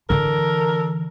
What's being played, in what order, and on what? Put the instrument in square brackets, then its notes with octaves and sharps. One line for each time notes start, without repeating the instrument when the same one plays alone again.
[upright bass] D3 E3 [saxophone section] D4 A4 A#4